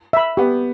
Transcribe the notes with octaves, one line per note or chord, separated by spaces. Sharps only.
E5 B5
B3 G4